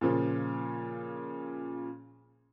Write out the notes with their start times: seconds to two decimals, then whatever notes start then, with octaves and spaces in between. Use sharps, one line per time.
0.01 A#2 C#3 F3